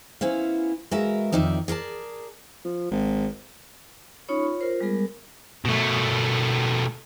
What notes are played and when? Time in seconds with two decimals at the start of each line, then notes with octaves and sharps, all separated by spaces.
0.21 B3 C#4 E4 C5 F5
0.91 G#3 F#4 A#4 B4 E5 F5
1.32 F2 D#3 D#4 D5 E5
1.68 G#4 A#4 D5 A5
2.65 F3
2.91 G#1
4.28 C#4 D#4 F4 C#5 B5 C#6
4.43 F4 C#5
4.61 F4 A#4 C5
4.81 G3 G#3 B3 G#4 A#4
5.65 B2 A3